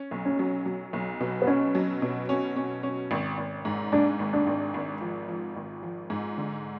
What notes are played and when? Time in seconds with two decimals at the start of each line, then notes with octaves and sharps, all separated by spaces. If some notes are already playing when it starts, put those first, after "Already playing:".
Already playing: C#4
0.11 B1
0.25 C#4
0.39 F#3
0.65 F#3
0.93 B1
1.20 B2
1.42 B3
1.47 B2 C#4
1.75 F#3
2.02 B2
2.29 C#4
2.56 C#4
2.83 C#4
3.11 G#1
3.38 G#1
3.65 G#2
3.92 G#2 D4
4.19 G#1
4.33 D4
4.47 G#1
4.74 G#1
5.01 F3
5.28 F3
5.56 G#1
5.83 F3
6.10 G#2
6.38 D3